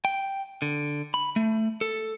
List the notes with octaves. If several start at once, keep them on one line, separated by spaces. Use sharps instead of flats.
G5
D3
B5
A3
A4